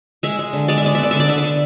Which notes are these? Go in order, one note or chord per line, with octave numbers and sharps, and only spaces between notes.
G#3 E5
G#3
D3
G#3 D5
E5
G#3 D5
B3 E5
D5
D3 E5
D5
D3 E5
D5
D3